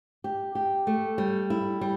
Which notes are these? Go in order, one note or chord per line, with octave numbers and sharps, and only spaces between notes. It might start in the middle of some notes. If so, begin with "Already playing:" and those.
G4
G4
A3
G3
E4
G3